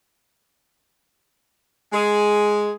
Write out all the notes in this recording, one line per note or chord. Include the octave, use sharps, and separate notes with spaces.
G#3 G#4